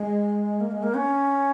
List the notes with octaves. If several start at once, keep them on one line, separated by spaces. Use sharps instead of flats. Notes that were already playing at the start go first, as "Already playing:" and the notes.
Already playing: G#3
A#3
G#3
A#3
C#4